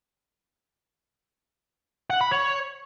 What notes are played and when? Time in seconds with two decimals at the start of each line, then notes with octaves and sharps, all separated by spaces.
2.10 F#5
2.21 B5
2.32 C#5